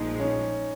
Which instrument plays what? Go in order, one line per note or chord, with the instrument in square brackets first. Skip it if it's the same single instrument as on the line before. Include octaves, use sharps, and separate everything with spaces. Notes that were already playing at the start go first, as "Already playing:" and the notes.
Already playing: [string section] A#1 A#2 F3 G#3 [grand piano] D#4
[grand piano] C#4